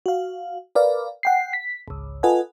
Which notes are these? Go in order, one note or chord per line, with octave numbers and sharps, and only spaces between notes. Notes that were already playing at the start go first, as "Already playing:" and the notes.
F#4 F5
A#4 B4 D5 F5
F#5 G5 C7
B6
G#1 C#2
F4 A4 B4 D#5 F#5 G#5